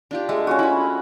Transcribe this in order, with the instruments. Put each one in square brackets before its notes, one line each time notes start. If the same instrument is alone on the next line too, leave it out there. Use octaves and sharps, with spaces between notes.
[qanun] D4 F4 G4
[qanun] G#3 A3 [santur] E5
[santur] C#4 F4 F#4
[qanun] E4 [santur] G#5 B5